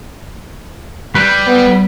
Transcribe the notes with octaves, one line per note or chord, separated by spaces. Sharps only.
G3 B4
B3